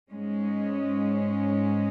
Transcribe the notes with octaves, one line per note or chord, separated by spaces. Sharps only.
G#2 G#3 C#4